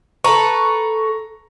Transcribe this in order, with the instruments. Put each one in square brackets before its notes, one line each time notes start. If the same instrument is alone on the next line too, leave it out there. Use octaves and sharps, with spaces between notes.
[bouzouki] A4 B4 [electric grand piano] A#5 C#6